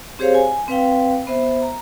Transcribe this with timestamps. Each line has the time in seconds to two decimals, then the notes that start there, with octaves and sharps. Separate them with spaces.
0.19 C4 G4 G#4 C5 C#5 F5
0.34 G#5
0.68 C4 B4 F5 G5
1.27 B3 C5 E5
1.62 A#5